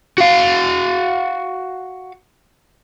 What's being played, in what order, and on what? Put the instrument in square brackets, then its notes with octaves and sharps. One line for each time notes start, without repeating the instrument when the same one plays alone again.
[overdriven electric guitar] F#4 F5